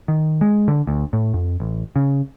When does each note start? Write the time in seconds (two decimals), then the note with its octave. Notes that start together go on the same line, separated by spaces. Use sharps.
0.08 D#3
0.41 G#3
0.68 D3
0.87 D2
1.13 A2
1.34 F2
1.60 A1
1.96 C#3